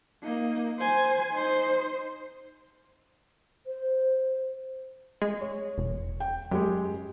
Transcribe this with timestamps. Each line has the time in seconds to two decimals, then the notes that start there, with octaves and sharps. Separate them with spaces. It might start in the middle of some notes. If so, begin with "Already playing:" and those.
0.23 A#3 D#4
0.79 C5 G#5
1.33 D#4 C5
3.66 C5
5.22 G#3
5.41 C#5
5.78 E1
6.20 G5
6.51 F#2 G#3 G4